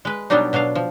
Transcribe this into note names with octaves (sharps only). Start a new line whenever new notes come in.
G#3 B4
B2 F#3 G3 B3 D4 D#4
B2 F#3 D4 F5
F3